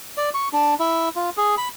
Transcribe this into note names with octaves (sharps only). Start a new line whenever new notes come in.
D5
C#6
D4
E4
F4
G#4
B5